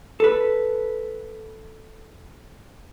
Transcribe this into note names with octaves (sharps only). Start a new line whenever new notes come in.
A4 B4